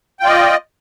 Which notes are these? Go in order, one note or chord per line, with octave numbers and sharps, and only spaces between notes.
F4 D5 D#5 G5